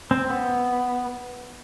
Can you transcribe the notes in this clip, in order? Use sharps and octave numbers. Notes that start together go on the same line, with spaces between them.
C4
B3